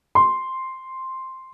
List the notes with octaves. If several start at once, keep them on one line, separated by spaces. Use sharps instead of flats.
C6